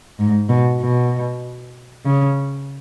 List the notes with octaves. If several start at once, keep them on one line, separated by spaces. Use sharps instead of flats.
G#2
B2
B2
C#3